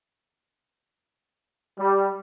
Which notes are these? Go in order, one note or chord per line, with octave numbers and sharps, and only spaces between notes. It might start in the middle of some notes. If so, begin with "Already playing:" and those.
G3